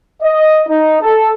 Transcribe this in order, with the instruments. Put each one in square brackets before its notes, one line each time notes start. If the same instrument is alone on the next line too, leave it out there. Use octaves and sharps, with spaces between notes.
[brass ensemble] D#5
D#4
A4